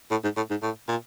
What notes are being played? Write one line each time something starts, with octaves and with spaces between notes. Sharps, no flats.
A2
G#2
A2
G#2
A2
A#2